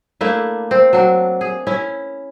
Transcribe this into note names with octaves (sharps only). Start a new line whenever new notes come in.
A3 A#3 D4 E4
C4
F#3 D4
G#4
C#4 E4